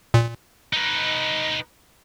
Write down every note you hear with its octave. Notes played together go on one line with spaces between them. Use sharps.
A#2
D#4 B4